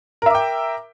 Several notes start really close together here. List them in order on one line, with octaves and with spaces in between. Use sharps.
A#4 E5 D6 G5